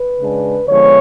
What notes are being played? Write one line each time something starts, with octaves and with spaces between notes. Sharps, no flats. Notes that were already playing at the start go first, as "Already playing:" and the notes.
Already playing: B4
C#3 G#3 D4
D3 F3 G#3 B3 C#5